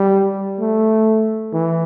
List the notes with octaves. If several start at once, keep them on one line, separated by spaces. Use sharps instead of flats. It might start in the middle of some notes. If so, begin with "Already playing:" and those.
Already playing: G3
A3
E3